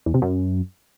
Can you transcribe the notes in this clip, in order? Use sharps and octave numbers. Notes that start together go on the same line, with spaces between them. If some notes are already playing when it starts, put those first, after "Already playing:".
E2
C3
F#2